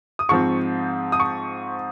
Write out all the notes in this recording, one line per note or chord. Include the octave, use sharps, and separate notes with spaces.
D#6
G#2 F3 C4 C#6
D#6
C#6